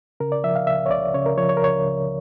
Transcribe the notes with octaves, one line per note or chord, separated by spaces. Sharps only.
C#3 A#4
D5
F3 E5
F5
C#2 E5
C#5
C#2 D5
C#3 C#5
A#4
F3 C#5
C#5
A#4
C#2 C#5
C#2